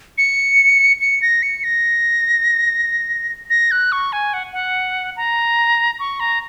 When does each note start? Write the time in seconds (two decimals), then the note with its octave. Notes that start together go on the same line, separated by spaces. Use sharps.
0.18 C#7
1.01 C#7
1.22 A#6
1.43 C#7
1.64 A#6
3.50 A#6
3.71 F#6
3.92 C#6
4.13 G#5
4.33 F#5
4.53 F#5
5.17 A#5
6.00 C#6
6.20 A#5